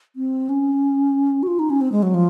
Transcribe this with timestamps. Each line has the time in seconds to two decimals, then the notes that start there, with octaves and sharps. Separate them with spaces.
0.16 C4
0.49 C#4
1.43 F#4
1.48 F4
1.59 D#4
1.70 C#4
1.81 C4
1.92 G#3
2.03 F#3
2.14 F3